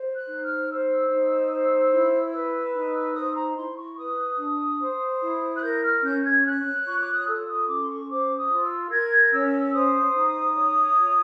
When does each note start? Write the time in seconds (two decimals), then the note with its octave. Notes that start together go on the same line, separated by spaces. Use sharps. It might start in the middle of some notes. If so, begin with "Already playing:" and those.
Already playing: C5
0.13 F#6
0.27 D#4
0.41 F6
0.68 C5 E6
1.09 D#4
1.50 C5
1.91 E4
2.32 B4
2.74 D#4
3.14 C5 D#6
3.35 A#5
3.55 E4 C6
3.76 C#6
3.96 B4 D#6
4.38 D4
4.79 C5
5.20 E4
5.54 F#6
5.61 A#4 G6
5.82 F6
6.02 C#4 G6
6.19 G6
6.23 G#6
6.43 C#5 F#6
6.85 F4 C#6
7.00 D6
7.12 D#6
7.25 A4 E6
7.46 D#6
7.66 C#4 D6
7.80 C6
7.87 C#6
8.07 C5 D6
8.35 D#6
8.48 F4
8.62 E6
8.89 A#4 G#6
9.30 C#4 E6
9.72 C5 D#6
10.13 D#4
10.54 C#5
10.95 F4